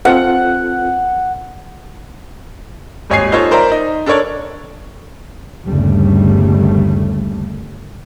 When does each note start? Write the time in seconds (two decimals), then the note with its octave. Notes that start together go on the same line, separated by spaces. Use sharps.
0.05 C4 F4 A4 F#5
3.10 D#1 G#1 C#5 D#5 G#5 C7
3.32 D#4 F4 A4 C5 C#5
3.51 A#4 C5 D5 E5 A#5
3.72 D#4
4.06 D4 A4 A#4 C#5 D5
5.65 G1 D#2 C#3 G3 A3